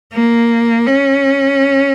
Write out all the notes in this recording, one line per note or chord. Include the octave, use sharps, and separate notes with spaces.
A#3
C#4